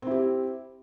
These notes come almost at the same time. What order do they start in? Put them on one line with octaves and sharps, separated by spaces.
C4 E4 G4